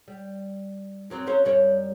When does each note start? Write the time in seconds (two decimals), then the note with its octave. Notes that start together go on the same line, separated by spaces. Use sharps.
0.08 G3
1.10 F#2 F#3 C4
1.27 F#3 C#4 C5
1.45 F#2 G3 C#5